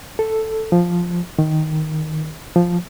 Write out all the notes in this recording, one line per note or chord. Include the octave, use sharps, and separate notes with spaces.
A4
F3
D#3
F3